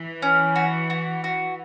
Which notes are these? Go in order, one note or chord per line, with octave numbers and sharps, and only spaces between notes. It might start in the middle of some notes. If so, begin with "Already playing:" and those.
Already playing: E3
C#4
F#4
F#4
F#4